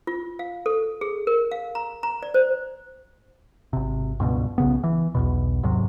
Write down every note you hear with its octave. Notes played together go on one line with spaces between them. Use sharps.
F4
F5
A4
G#4
A#4
F5
A#5
A#5
D5
C5
G#1 C3
C#2 G2 B2
B1 C#3 B3
E3
B1 E2 B2
D#2 G#2 C3 F#3